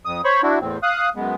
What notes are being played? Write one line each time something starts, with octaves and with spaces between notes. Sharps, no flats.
F2 D#6
C5 C#5 B5 C#6
D4 E4 F#4
E2 A2 C4
F5 D#6 F#6
F#2 G#3 B3